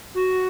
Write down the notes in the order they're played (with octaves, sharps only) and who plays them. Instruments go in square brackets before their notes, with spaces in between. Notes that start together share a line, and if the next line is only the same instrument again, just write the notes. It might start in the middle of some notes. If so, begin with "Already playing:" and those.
[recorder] F#4